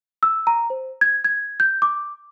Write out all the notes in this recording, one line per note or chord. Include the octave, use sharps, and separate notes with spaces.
E6
A#5
C5
G#6
G#6
G6
D6